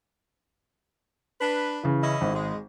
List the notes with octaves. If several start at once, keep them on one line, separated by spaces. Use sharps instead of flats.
D4 B4
C#3 E3
C#4 E4 D#5
G#1
G#3